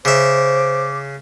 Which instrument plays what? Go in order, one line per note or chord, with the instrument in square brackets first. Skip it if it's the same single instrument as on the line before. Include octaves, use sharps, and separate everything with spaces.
[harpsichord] C#3 E5 [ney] C5 [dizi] D6